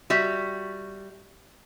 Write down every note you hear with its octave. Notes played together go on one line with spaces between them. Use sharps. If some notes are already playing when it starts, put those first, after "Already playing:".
G3 F#4 E5